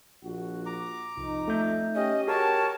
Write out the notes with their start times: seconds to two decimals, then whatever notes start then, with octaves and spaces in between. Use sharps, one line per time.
0.24 A#1 F#4
0.66 A#5 D6
1.17 C2 F2 D#4
1.48 A3 E5 G6
1.95 C#4 G4 D#5
2.28 F#4 G#4 A#4 C#5 A5